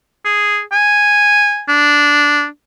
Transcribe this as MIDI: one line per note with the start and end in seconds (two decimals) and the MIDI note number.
0.25 0.61 68
0.72 1.63 80
1.69 2.46 62